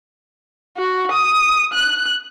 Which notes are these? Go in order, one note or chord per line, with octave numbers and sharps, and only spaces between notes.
F#4
D#6
F#6